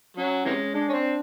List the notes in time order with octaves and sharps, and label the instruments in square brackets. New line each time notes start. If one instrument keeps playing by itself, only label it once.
[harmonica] F#3 [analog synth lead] C#4
[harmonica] C3 E3 G#3
[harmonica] G#3 [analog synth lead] D4
[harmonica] C#4
C4